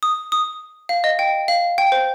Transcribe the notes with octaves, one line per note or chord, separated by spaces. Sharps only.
D#6
D#6
F5
D#5
G5
F5
G5
C5